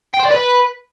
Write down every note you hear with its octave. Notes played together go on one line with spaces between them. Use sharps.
G5
C5
D5
B4